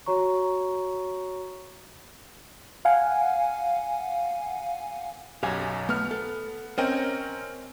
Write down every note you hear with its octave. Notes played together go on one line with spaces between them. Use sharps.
F#4 C#5 A#5 C#6
F5 F#5 G#5
B1 F#2 G4 F5 G#5
A3 B3 F6
A4
C4 C#4 A#4 C5 D#5 G5